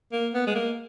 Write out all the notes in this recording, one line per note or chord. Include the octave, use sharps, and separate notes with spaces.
A#3
B3
G#3
A#3